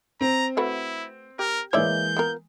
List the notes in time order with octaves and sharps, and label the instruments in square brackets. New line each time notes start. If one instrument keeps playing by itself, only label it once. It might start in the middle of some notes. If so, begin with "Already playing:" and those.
[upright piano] C4 [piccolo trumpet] A#5
[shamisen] A3 F#4 B4 [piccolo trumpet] E4
[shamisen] G4 [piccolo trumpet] A#4
[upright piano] E3 G#3 A#3 [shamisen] C#5 D5 E5 [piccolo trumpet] G6
[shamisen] B3 F4 A#4